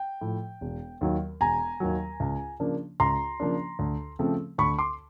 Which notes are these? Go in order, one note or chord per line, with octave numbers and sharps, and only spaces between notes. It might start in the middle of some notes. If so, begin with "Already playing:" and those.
Already playing: G5
A2 F3
E1
D#2 D#3 F#3
E1 G#5 A#5
D#2 D#3 F#3
C#2
C#3 F3 A#3 D4
C#2 A#5 C6
C#3 F3 A#3 D4
D2
C#3 F3 A3 C4
D2 B5 C#6
C6 D6